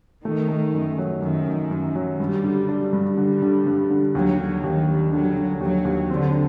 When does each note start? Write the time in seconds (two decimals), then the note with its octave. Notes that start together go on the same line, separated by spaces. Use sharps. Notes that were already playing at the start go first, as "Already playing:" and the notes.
0.24 D#3 A3
0.48 A3
0.74 F#2
0.98 F#3
1.22 F#2 D#3
1.46 F#2
1.71 F#2
1.95 F#3
2.19 G2 G3
2.44 D3
2.68 D4
2.93 G2
3.17 D3 G3
3.42 D3
3.66 G2
3.90 D3
4.15 D#2 F#3
4.39 D3
4.64 D#2 D#3
4.88 G3
5.12 D3 F#3
5.37 D3
5.61 D#2 F#3
5.85 D#2
6.10 D3 C4